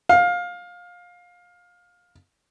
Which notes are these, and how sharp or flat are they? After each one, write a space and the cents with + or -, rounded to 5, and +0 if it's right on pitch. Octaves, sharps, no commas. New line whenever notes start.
F5 +20